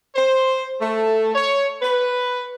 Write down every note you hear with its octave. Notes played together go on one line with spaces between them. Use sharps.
C5
A3
C#5
B4